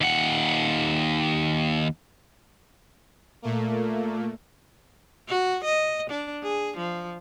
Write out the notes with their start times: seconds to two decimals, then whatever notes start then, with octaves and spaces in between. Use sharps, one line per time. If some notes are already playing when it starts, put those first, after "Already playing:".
0.01 D#2 F#5
3.42 A#2 A3 A#3
5.28 F#4
5.64 D#5
6.10 D4
6.43 G#4
6.77 F3